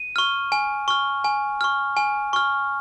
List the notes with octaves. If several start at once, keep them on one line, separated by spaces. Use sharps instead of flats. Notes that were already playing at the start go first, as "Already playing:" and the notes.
Already playing: D#7
C#6 F6
G#5
C#6 F6
G#5
C#6 F6
G#5
C#6 F6